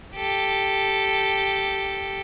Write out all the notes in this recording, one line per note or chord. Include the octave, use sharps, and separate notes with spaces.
G4 A4